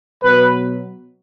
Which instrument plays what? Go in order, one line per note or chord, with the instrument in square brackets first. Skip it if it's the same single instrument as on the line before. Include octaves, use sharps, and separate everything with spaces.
[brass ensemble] B2 F#3 B4